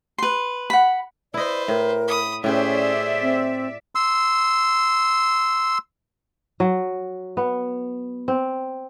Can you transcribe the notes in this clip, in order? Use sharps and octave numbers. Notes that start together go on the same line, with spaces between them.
B4 C6
F#5 B5
E4 B4 C5 D5 D#5
A2 A#4
B5 D#6
A2 C#4 G4 G#4 B4 C5 D5 E5
C4
C6 E6
F#3
B3
C4